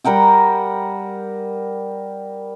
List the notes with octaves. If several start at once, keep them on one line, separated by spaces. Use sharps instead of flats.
G3 A#4 F#5 G5